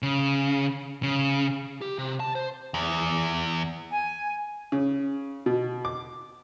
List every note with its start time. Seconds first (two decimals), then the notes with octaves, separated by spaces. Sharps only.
0.03 C#3
1.03 C#3
1.82 G4
1.98 C3
2.20 A5
2.35 C5
2.74 E2
3.91 G#5
4.72 C#3
5.46 B2
5.85 D6